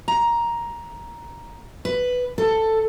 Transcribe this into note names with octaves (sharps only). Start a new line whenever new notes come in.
A#5
B4
A4